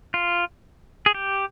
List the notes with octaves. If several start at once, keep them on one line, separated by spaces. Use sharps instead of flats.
F4
G#4
G4